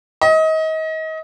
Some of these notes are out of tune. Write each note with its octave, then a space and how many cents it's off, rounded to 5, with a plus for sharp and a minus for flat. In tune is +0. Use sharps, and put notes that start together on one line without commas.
D#5 +30